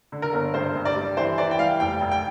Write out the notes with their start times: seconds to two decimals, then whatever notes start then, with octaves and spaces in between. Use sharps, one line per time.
0.12 D3
0.22 A#4
0.33 G1
0.54 G2 C5
0.75 G2
0.85 D5
0.96 G3
1.17 E3 C5
1.38 E3 D5
1.51 G5
1.58 G3 F5
1.80 F1 G5
2.01 F1
2.11 G5